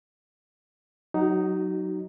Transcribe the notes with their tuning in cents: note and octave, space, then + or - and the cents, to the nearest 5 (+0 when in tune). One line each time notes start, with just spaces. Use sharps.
F#3 +0 D#4 +0 F#4 +35